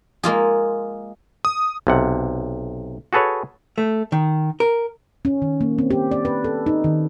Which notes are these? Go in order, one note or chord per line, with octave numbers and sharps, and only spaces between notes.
G#3 A#3 F4 G#4
D#6
B1 C3 F#5
F#4 G#4 A4 B4 C#5
A3
D#3
A#4
C#4
D#3
A#3
C4
G4
D5
B4
A4
D#4
D#3